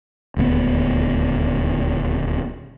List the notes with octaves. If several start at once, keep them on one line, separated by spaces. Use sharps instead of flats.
D#1 D2 A3 B3